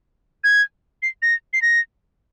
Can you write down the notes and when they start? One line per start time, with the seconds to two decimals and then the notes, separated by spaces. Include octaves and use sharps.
0.44 G#6
1.02 C7
1.22 A#6
1.53 C7
1.62 A#6